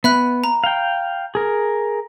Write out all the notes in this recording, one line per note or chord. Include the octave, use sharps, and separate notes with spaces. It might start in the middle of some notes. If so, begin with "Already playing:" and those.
B3 E5 B5 F#6
A#5
F5 G5
G#4 A#4